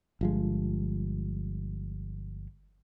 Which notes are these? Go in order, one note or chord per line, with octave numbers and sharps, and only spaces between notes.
G1 F3 G#3